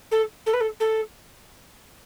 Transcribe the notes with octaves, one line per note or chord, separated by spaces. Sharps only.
A4
A4
B4
A4
A4